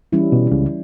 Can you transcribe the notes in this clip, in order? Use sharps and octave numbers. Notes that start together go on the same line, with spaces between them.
E3 G3 C#4 E4
B2
C#2 C#3